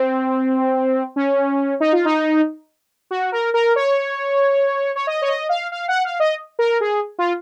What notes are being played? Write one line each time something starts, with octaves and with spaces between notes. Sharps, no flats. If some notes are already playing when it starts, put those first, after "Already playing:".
Already playing: C4
C#4
D#4
F4
D#4
F#4
A#4
A#4
C#5
C#5
D#5
C#5
D#5
F5
F5
F#5
F5
D#5
A#4
G#4
F4